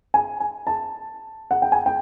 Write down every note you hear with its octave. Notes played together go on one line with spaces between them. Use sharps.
G#5
G#5
A5
F#5
G5
G#5
G5